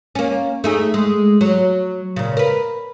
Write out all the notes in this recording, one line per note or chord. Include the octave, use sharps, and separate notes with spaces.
A#3 C#4
A3 D#4 G#4
G#3
F#3
A#2 C#3
A#4 B4